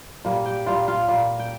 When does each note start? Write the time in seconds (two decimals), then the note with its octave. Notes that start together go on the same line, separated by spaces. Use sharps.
0.25 A#2 G3 A#3
0.45 G4 G5
0.66 A#2 G3 A#3 F4 F5
0.88 F4 F5
1.08 A#2 G3 A#3
1.40 G5